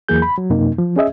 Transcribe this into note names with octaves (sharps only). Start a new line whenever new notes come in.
E2 E3 F#3 A#3 G#4 G6
B5
F#3
F#2 C3 A#3 D#4
F3
C#4 G#4 D#5 E5